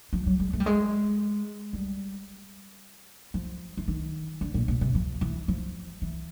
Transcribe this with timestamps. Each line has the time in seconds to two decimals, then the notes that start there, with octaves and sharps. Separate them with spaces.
0.13 F3
0.26 F#3
0.40 G#3
0.53 A3
0.60 G3
0.66 G#3
1.73 G3
3.34 F3
3.77 E3
3.88 D#3
4.41 D3
4.54 A#2
4.68 A#2
4.81 C3
4.95 F3
5.21 E3
5.48 F3
6.02 E3